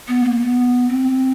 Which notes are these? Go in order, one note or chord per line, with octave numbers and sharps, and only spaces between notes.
B3
A#3
B3
C4